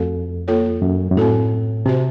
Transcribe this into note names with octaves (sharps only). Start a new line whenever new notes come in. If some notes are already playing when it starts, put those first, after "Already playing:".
Already playing: F2 A3 C4 F#4 A4
A#3 F4 A4 C#5
F#2
F#2
A2 C4 F#4 A4
C3 C4 F#4 C5